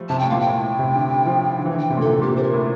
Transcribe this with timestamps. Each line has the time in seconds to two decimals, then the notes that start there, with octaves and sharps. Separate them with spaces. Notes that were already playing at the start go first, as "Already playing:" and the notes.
Already playing: F3 G3 A3
0.09 C3 A5
0.19 A2 G5
0.30 A#2 F5
0.41 G5
0.47 A2
0.79 C3
0.95 D3
1.26 F3
1.59 D3
1.65 E3
1.74 D3
1.79 G5
1.90 C3
1.97 A#2
2.01 C3 A4
2.22 A#2 G4
2.36 C5
2.43 A#4
2.54 A2